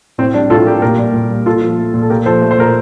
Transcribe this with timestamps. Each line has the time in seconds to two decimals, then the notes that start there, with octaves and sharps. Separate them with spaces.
0.18 A2 C4
0.34 G3 D4
0.50 A2 F4 A4
0.66 G3 G4 A#4
0.82 A#2 G4 A#4
0.98 G3
1.14 A#2
1.30 G3
1.46 A#2 F4 A4
1.62 F3
1.78 A3
1.94 A#2
2.02 A4
2.10 A#2 G4 A#4
2.26 F3 A4 C5
2.42 A3
2.51 C5
2.58 A#2 A#4